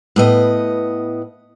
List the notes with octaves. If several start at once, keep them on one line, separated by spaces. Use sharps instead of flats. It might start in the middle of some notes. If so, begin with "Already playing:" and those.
A2 B3 D#5